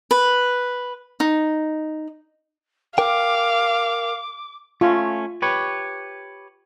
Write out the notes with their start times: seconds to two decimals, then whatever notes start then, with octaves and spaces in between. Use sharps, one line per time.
0.11 B4
1.20 D#4
2.98 A#4 F5 G5 D6
4.81 A3 C#4 F4
5.42 G4 B4 C#5